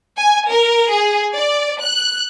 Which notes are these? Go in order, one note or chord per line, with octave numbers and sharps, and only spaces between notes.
G#5
A#4
G#4
D5
F#6